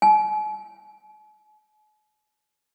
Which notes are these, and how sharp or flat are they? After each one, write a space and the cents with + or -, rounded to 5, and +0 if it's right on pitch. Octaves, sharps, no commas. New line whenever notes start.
G#5 +45